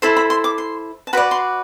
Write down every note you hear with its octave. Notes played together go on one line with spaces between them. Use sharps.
E4 A4 C5 B5
B5
C6
D6
C6
A5
F#4 B4 D5 B5
C6